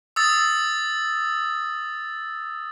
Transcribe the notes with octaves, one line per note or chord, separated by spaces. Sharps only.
D#6 E6 A6